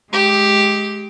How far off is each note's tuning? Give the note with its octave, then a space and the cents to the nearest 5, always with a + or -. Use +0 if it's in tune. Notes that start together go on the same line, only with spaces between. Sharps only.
G#3 +25 G4 +0